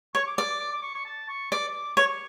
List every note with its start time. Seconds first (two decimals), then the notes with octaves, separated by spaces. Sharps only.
0.15 C#5 C#6
0.26 D6
0.37 D5 D6
0.49 D6
0.60 D6
0.72 D6
0.82 C#6
0.95 C#6
1.06 A5
1.29 C#6
1.51 D5 D6
1.97 C#5 C#6